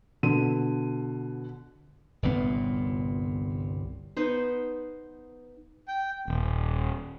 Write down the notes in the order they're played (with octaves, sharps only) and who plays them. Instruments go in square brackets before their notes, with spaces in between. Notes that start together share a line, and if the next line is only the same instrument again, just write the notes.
[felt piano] B2 D3 D#7
[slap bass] G1 C2 A#2 B3
[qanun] B3 D#4 C5
[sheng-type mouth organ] G5
[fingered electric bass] D#1